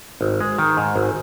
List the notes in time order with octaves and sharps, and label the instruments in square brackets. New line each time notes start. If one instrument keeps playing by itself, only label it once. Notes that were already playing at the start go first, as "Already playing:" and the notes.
[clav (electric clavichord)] G#1
G#3
D#3
G#2
G#1